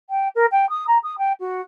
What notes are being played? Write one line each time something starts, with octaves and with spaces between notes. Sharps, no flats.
G5
A#4
G5
D#6
A#5
D#6
G5
F#4